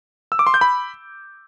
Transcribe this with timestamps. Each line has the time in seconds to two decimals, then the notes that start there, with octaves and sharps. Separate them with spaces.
0.32 E6
0.39 D6
0.47 C6
0.54 G6
0.61 B5